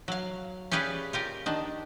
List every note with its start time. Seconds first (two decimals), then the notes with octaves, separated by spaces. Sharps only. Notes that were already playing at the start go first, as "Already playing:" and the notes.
0.08 F#3 F5
0.71 C#4 G4 G#4 B4 D5 F5
1.13 F4 G4 A#4
1.46 D#3 D4